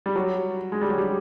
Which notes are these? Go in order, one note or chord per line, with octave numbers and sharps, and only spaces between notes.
G3
F#3
G#3
G3
F#3
G3